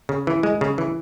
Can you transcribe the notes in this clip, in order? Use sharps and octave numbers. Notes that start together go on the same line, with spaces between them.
C#3
E3
G#3
C#3
E3